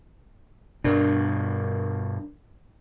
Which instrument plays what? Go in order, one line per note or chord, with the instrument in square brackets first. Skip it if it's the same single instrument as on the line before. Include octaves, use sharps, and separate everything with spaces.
[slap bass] G2 B2 [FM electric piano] D4 A#4